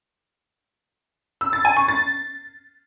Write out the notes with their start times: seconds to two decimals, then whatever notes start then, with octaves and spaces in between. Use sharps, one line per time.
1.41 E6
1.53 A6
1.65 G#5
1.77 C#6
1.88 A6